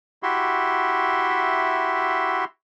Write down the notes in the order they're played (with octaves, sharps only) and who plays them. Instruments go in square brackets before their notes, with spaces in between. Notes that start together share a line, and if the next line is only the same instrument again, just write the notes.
[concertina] E4 F#4 G4 E5 C6